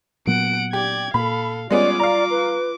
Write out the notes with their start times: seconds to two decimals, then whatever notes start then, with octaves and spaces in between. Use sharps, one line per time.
0.27 A#2 F#3 B3 F#5 D7
0.73 G4 D5 G#6
1.14 A#2 A#3 A4 F5 B5
1.71 G3 G#3 B3 C#4 F4 D5 D6
2.00 D5 F5 A#5
2.31 B4